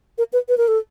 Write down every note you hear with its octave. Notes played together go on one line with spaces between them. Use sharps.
A#4
B4
B4
A#4
A4